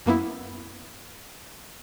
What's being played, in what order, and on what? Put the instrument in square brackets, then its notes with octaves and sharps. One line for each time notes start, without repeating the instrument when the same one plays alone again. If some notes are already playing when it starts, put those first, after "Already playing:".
[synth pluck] F#2 A#3 B3 E4